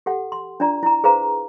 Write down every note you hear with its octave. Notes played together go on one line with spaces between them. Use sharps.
G4 A4 F#5
C6
D4 F4 D5 A#5
E4 A#5
G#4 B4 C5 F5 A#5